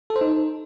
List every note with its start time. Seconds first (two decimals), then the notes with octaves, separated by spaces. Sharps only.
0.10 A4
0.16 C5
0.21 D#4